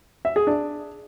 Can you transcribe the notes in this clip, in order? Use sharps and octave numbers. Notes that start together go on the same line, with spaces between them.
E5
G#4
D4